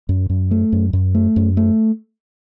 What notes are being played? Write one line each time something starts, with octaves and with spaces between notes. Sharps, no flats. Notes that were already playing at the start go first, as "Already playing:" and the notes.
F#2
F#2
A3
F#2
F#2
A3
F#2
A3